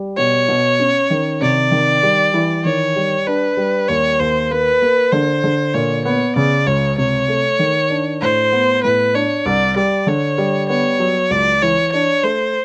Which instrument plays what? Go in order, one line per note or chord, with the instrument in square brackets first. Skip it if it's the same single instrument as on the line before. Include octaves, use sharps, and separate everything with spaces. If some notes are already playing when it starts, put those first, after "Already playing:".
Already playing: [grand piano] G3
[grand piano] B2 [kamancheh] C#5
[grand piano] B2
C#4
D#3
[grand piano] C3 [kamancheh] D5
[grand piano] D#3
G3
E3
[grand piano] D#3 [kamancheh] C#5
[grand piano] G3
[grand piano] D4 [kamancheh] B4
[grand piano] G3
[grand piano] D#2 [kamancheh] C#5
[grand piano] D#2 [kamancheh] C5
[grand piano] A#3 [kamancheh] B4
[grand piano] A#3
[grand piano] D3 [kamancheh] C5
[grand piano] D3
[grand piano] A#2 [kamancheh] C#5
[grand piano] B3 [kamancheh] C#5
[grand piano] C#3 [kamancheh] D5
[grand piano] C#2 [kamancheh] C#5
[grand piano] C3 [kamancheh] C#5
[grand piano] A3
D#3
D4
[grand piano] A2 [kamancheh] C5
[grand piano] B3
[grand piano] A2 [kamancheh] B4
[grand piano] D4 [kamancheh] C#5
[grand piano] C2 [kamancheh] D5
[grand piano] G3 [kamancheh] D5
[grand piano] D3 [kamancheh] C#5
[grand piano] G3
[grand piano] B3 [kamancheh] C#5
[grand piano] F#3
[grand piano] C#2 [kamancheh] D5
[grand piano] E3 [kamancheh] C#5
[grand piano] D4 [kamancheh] C#5
[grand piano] A3 [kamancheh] C5